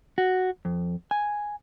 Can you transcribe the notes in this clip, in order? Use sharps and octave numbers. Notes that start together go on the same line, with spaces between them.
F#4
F2
G#5